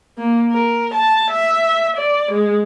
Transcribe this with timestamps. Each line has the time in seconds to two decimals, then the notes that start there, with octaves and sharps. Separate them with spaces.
0.18 A#3
0.52 A#4
0.94 A5
1.31 E5
1.96 D5
2.32 G#3